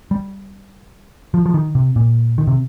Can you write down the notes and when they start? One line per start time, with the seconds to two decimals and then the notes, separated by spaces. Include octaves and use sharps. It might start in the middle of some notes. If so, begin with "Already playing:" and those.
0.11 G3
1.34 F3
1.46 F3
1.54 D#3
1.75 C3
1.96 A#2
2.38 D#3
2.47 C3